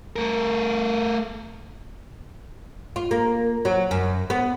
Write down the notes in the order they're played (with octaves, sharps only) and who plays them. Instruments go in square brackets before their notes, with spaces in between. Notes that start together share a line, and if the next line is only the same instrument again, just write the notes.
[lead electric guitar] A3 A#4
[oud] F4
A#3
F#3
F#2
B3